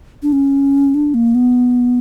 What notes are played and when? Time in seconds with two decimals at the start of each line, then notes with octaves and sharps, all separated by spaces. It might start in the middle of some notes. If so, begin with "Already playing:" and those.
0.23 D4
0.33 C#4
0.94 D4
1.14 A#3
1.35 B3